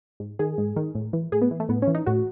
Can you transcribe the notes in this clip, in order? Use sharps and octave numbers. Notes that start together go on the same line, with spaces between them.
G#2
D#3 G#4
G#2
D#3
A2
E3
A2 G#4
B3
E3
A3
A2 B3
C#4
E3
D#4
A2 F#4